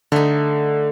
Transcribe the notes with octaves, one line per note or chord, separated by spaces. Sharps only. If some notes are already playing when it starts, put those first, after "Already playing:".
D3 A3 D#4